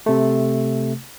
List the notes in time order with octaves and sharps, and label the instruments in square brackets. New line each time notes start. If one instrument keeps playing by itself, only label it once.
[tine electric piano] C3 A3